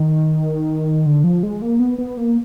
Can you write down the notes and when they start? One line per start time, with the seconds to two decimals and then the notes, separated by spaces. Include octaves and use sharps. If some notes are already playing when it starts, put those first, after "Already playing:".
Already playing: D#3
1.06 D3
1.24 F3
1.43 G#3
1.62 A#3
1.80 B3
1.98 B3
2.17 A#3